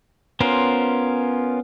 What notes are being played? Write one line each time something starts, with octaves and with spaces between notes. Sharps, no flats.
B3 C#4 F4 A#4 C5